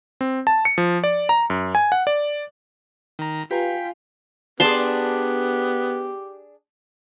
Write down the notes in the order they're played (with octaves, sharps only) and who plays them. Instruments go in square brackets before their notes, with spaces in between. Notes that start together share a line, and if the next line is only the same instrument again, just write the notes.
[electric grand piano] C4
A5
C#7
F3
D5
A#5
F#2
G#5
F#5
D5
[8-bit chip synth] D#3 A#5
[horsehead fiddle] F4 [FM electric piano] G4 B4 A#5 [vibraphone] F5 G#5 [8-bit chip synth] G5 B6
[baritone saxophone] B3 [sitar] D4 G#4 [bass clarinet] G4 [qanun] A5 C6